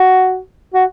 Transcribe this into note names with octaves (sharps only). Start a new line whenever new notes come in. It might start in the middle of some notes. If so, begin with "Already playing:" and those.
Already playing: F#4
F#4